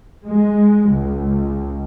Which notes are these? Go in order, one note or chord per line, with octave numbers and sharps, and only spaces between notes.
G#3
C#2